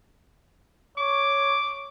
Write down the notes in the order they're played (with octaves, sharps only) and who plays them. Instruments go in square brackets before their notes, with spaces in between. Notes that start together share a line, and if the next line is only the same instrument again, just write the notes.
[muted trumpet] C#5 [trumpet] D6